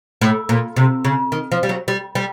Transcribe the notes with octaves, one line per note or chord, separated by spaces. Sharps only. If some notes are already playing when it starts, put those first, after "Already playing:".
A2
A#2
C3
C#3
D#3
F3
G3
F#3
G3
G3